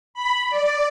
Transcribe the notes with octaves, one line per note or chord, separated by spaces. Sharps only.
B5
D5